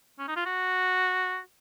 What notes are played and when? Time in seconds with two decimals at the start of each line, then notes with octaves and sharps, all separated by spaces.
0.19 C#4
0.28 D#4
0.36 F4
0.46 F#4